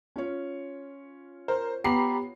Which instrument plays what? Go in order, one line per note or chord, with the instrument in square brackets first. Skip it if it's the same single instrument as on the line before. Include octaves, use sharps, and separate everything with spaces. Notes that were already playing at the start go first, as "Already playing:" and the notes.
[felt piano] C#4 F4 C#5
[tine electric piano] A#4 [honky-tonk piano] C5
[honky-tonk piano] B3 C7 [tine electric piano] G4 A#5 B5